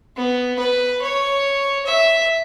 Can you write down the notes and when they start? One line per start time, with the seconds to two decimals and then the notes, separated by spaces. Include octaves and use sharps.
0.17 B3
0.59 B4
1.02 C#5
1.86 E5